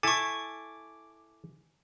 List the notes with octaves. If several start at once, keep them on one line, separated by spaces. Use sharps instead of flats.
E4 A4 G#5 C#6 D6